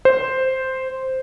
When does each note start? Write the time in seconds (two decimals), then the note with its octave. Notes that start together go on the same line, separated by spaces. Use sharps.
0.05 C5